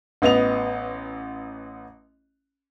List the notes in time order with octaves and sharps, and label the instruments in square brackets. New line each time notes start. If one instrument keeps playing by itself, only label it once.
[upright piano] A1 B3 D#5 F7